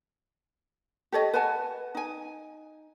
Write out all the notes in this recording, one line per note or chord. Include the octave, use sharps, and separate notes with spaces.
G4 A4 C#5 D#5
B4 F#5 G#5 A5
D#4 G#5